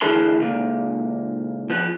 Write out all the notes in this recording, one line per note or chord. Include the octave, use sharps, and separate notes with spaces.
D2 E3 G#4 A#4 A5 C6
C#2 A#2
F3 B3